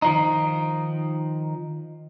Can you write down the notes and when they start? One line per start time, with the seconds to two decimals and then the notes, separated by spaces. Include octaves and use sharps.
0.02 D#3 F3 D#4